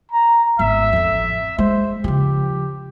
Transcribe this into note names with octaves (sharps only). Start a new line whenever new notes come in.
A#5
G#1 B3 E5
A1 F2
G#3 C5
C#3 F3 G4